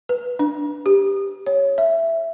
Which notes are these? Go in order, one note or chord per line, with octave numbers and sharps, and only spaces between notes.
B4
D4
G4
C#5
E5